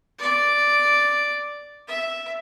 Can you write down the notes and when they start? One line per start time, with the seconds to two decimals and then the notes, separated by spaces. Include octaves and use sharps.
0.19 D5 D6
1.88 E5